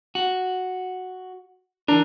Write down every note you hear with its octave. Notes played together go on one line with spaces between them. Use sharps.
F#4
E3 D4 A#4